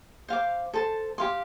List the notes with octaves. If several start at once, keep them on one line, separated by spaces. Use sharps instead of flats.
C5 F5 D6
A4 C5 A5
G4 F5 C6